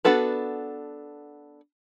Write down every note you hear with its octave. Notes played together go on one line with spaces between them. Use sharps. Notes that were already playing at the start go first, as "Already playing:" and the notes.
B3 D4 F#4 A4 B4